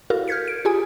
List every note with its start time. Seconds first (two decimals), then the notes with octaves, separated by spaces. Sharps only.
0.10 E4 F#4 A4 A#4 F5
0.28 F6 G6 G#6 B6 C#7
0.48 D7
0.65 F4 G4 G#4 G#5 D#6